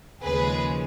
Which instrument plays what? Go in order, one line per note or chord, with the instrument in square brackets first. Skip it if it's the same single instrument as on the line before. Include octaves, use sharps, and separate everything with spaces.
[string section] D#2 C#3 F3 G#3 G#4 B4